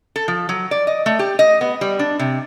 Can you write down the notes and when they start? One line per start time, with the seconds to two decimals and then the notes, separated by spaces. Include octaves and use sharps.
0.16 A4
0.28 F3
0.49 F#3
0.71 D5
0.87 D#5
1.06 A3
1.19 G4
1.39 D#5
1.61 B3
1.81 G3
1.99 D4
2.19 C3